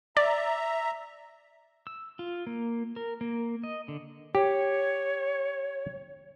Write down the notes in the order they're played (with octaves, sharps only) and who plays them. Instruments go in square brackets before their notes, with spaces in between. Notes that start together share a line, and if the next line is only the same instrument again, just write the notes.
[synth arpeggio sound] D5 [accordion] E5 A#5
[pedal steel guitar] E6
F4
A#3
A#4
A#3
D#5
D3
[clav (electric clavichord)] G4 [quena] C#5